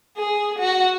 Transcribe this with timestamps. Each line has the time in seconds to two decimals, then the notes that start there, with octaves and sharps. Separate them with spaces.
0.17 G#4
0.59 F#4